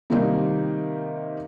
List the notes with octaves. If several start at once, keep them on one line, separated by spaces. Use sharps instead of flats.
C3 D#3 G3 A#3 C4 D#4